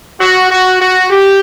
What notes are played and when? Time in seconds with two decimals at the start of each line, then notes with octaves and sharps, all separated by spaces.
0.20 F#4
0.51 F#4
0.81 F#4
1.11 G4